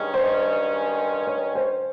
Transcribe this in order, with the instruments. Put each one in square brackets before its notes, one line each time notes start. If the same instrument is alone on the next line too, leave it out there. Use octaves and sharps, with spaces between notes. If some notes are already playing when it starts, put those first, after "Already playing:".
Already playing: [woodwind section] G2 D#3 G#3 C#4
[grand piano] C5
C#5
C5